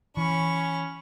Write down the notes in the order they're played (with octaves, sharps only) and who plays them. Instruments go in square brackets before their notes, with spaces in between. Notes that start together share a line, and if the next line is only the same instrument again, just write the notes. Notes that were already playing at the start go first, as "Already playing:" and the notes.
[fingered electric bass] E3 [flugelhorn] C#4 [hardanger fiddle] B5 C#6